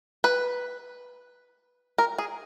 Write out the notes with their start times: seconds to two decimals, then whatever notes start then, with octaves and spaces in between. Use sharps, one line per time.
0.24 B4
1.98 A#4
2.18 G#4